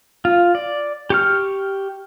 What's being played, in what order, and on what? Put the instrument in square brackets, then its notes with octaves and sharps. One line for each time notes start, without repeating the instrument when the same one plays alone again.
[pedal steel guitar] F4
D5
G4 C#6 F6